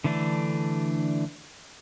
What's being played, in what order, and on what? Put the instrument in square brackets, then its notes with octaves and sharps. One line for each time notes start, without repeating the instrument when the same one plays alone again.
[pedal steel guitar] D3 E3 A3 D4